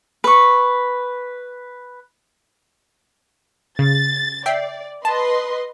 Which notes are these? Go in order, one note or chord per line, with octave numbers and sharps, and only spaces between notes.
B4 C#6
C#3 A6
D5 E5 G5 C7
B4 D#5 A5 C6